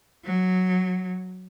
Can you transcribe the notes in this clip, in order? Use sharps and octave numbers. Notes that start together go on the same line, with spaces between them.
F#3